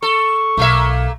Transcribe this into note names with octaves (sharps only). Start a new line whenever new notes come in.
A4 C#6
B1 A3 A#3 E5